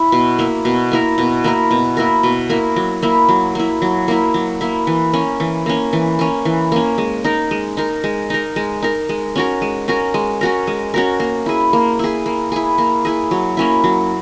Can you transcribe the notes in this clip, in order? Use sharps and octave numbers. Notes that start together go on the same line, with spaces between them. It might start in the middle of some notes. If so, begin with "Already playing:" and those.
Already playing: E4
B2
A#3 E4
B2
A#3 E4 A#4
B2
A#3 E4 A#4
B2
A#3 E4 A#4
B2
A#3 E4 A#4
F#3
A#3 E4
F#3
A#3 E4
F#3
A#3 E4
F#3
A#3 E4
E3
A#3 C#4
E3
A#3 C#4
E3
A#3 C#4
E3
A#3 C#4
G#3
D#4 A#4
G#3
D#4 A#4
G#3
D#4 A#4
G#3
D#4 A#4
G#3
C#4 F#4 A#4
G#3
C#4 F#4 A#4
G#3
C#4 F#4 A#4
G#3
C#4 F#4 A#4
A#3
E4 G#4
A#3
E4 G#4
A#3
E4 G#4
A#3
E4 G#4
F#3
A#3 C#4 E4
F#3